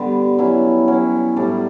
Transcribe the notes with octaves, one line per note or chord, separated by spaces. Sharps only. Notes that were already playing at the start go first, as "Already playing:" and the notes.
Already playing: D3 G3 B3
F#3 C#4 E4
F#3 C#4 E4
A2 G3 D4